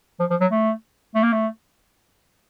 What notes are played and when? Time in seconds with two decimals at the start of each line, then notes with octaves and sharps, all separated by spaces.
0.20 F3
0.30 F3
0.41 F#3
0.51 A3
1.15 A3
1.24 A#3
1.33 A3